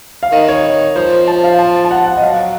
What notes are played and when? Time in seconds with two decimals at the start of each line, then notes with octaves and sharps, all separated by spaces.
0.23 F5
0.32 D#3 D#5
0.48 C#5
0.96 F3 C5
1.28 A5
1.44 F5
1.59 A5
1.85 A5
1.91 F#5
2.06 F#5
2.17 D#5
2.22 F#3 F5